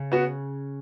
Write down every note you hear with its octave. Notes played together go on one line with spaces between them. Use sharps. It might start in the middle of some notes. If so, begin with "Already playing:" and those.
Already playing: C#3
B3 F#4